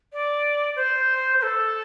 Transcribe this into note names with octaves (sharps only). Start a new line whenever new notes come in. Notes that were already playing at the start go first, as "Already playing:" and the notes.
D5
C5
C5
A4